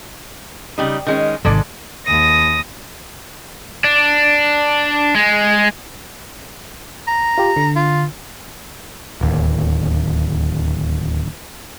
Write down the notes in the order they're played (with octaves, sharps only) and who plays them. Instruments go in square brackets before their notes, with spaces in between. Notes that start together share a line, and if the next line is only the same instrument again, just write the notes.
[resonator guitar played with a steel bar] C#3 G3 D#4
D#3 G#3 C#4
[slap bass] G#1 C3 D#3 [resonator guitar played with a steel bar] G#3 A4 D5
[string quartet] D#2 D#6 A#6
[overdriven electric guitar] D4
G#3
[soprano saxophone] A#5
[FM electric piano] F4 G4
D3
[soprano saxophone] F4
[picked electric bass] D1 D#2